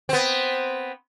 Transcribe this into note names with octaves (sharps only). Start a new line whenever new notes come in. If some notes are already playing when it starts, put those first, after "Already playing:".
B3 C4